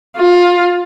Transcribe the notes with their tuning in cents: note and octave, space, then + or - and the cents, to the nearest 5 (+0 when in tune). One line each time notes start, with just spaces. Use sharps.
F4 +20